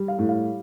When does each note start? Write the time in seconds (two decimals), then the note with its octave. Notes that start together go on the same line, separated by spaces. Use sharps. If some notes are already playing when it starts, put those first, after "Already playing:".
Already playing: G3
0.08 F5
0.19 A2
0.29 F5